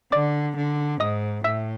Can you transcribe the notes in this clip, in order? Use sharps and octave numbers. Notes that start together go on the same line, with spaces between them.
D3 D5 D6
D3
G#2 D#5 D#6
A2 E5 E6